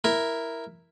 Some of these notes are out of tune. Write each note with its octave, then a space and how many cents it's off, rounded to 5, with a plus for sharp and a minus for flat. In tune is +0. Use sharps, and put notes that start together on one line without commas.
E4 +0 A#4 +0